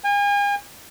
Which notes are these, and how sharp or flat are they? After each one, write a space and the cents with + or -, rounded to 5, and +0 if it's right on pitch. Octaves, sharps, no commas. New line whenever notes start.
G#5 -40